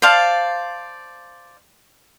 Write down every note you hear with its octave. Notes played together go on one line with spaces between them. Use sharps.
C5 D5 F5 A5